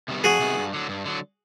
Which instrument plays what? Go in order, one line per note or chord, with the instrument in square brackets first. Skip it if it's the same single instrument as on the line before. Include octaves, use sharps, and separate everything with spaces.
[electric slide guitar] C3 D#3 G3 B3
[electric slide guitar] F2 [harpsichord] F#4 G#4
[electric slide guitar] C3 D#3 G3 B3
G2
D3 F#3
G2
D3 F#3